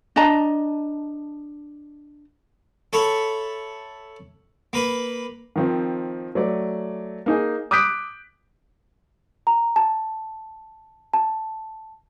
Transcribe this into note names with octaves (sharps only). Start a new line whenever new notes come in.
D4 D#5 A5 A#5
A4 C#5 E5 B5 C#6
A#3 B4 B5
D#3 F3 C4
F#3 A3 D5
A#3 D#4 G#4
D6 D#6 F#6 G6 B6 D7
A#5
A5
A5